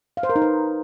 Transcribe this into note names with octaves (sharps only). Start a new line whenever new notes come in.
F5
C5
A#4
D#4
B4